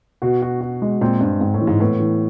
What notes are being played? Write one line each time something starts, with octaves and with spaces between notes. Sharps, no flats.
B2 F#4
F#4
F#4
G#3
A#2 C4
G2 C4
G#2 C4
A2
E3
G#2
A2 B3
E3